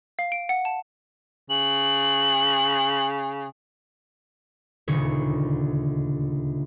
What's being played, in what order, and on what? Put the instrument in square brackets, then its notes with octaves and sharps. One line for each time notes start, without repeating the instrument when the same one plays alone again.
[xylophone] F5
D7
F#5
A5
[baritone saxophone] C#3 [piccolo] F#7
[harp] D#1 D2 C#3 C#5